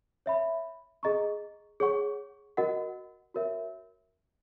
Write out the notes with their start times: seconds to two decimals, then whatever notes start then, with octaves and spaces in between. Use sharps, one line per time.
0.26 C#5 E5 B5
1.03 G#4 D#5 A#5 C#6
1.80 G#4 C#5 F#5 C#6
2.57 F#4 A#4 D#5 F#5
3.34 F#4 A#4 C#5 E5